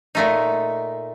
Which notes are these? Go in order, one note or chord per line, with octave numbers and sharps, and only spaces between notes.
A#2 A3 D#4